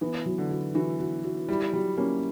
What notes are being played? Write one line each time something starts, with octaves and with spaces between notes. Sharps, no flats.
E3 B3
F#3
D3
F#4
E3 F#4
F#4
F#4
G3 E4
F#3 G3
A#3 C#4